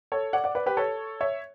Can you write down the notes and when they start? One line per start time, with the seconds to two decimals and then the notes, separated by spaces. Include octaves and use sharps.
0.12 A4 C#5
0.33 D5 F#5
0.44 D5 F#5
0.55 B4 D5
0.66 G4 B4
0.77 A4 C#5
1.21 C#5 E5